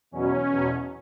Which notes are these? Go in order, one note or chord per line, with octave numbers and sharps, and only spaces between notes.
E2 B2 F#3 C#4
E2 B2 F#3